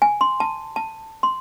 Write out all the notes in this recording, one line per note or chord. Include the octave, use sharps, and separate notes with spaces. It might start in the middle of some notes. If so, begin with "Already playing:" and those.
G#5
C6
A5
A5
C6